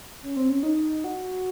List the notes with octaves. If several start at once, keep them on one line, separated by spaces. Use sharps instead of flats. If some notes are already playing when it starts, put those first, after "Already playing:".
C#4
C4
C#4
D#4
F#4